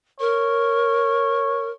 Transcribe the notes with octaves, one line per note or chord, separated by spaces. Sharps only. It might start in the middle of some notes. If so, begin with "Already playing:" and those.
A#4 C#5